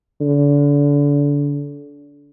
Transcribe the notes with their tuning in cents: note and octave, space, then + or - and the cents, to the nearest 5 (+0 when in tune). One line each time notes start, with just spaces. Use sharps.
D3 -30